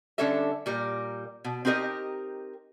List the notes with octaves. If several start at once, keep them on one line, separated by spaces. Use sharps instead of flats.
D3 G3 C#4 D4 A4 E5
A#2 G3 A#4
B2
C4 D#4 G4 A#4 D#5